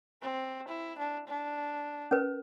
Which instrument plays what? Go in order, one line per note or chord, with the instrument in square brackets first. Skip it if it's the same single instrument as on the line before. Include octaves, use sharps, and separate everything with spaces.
[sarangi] C4
E4
D4
D4
[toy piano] C#4 A#4 B4